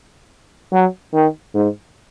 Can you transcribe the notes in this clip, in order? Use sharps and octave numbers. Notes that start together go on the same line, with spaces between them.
F#3
D#3
G#2